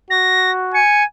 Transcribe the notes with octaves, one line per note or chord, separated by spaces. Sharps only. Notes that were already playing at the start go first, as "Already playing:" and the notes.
F#4 A#6
G#5 C#7